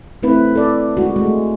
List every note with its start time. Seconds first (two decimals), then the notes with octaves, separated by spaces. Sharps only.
0.23 A3 C4 E4 B4
0.55 A4 D5
0.97 G#3 F#4
1.16 G#3 A3